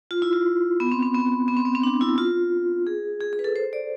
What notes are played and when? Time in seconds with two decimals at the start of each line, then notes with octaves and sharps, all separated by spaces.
0.11 F4
0.22 E4
0.33 F4
0.80 B3
0.92 C4
1.02 C4
1.14 B3
1.48 B3
1.57 C4
1.65 B3
1.75 C4
1.83 D4
2.01 E4
2.18 F4
2.87 G#4
3.21 G#4
3.33 G#4
3.39 B4
3.44 A4
3.56 C5
3.73 D5